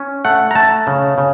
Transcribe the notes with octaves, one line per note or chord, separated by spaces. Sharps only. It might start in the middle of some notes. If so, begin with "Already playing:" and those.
Already playing: C#4
A3 F#5
A#5
A3 A5
C#3
C#3